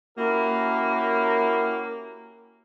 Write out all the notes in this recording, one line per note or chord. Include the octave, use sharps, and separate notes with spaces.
A#3 C#4 E4 F#4 G4 A#4